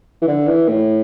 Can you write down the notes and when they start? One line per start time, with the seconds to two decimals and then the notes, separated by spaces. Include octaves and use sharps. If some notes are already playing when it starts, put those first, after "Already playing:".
0.22 E3
0.28 D3
0.47 E3
0.69 A2